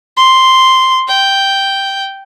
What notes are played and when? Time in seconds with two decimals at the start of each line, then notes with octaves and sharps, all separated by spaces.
0.17 C6
1.08 G5